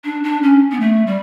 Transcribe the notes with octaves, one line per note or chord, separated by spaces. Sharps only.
D4
D4
C#4
B3
A3
G3